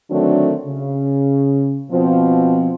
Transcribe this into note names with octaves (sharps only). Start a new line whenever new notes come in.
D3 D#3 F#3 A3 C4 D4
C#3
B2 F3 C4